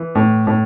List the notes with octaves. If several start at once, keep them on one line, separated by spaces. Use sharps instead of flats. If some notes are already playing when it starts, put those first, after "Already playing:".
Already playing: E3
A2
A2